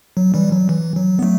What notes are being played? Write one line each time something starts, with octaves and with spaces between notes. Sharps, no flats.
F#3
E3 G3
F#3
E3
F#3
B3
F#3 A3